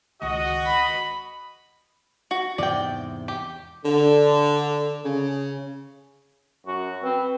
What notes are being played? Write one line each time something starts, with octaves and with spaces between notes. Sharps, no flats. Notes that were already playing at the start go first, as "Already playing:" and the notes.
C#2 D#3 F#4 D#5
B5
F#4
E2 G#2 C3 D5 G5
G4
D3
C#3
F#2 F#4
C4 B4